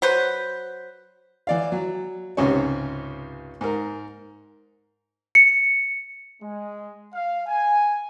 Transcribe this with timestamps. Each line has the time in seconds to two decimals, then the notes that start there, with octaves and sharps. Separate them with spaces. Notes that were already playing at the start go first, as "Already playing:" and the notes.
0.02 F#3 B4 C5
1.47 E3 D5 F5
1.72 F#3
2.37 C#2 G#2 C3 C#4 C#5
3.61 G#2 A#4
5.35 C#7
6.42 G#3
7.13 F5
7.47 G#5